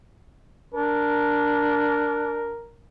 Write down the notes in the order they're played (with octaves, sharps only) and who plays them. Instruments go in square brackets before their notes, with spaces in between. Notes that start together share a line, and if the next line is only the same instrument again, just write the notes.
[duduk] D4 [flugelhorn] A#4